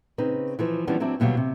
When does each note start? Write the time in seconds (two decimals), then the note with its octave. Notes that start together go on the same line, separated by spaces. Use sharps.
0.18 C#3 C4 D#4 B4
0.59 E3 F3 B4
0.87 E3 F3 G3 B3 C#4 D4
1.00 F#3 C4 D4 E4
1.20 D#2 B2 F#3 G3 F5
1.37 C3